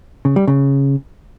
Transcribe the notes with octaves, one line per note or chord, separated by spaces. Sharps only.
C#3
G3
C#3